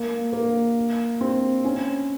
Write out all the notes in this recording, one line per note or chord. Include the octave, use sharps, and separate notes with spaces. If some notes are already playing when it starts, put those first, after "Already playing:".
Already playing: A#3
A#3
C4
C#4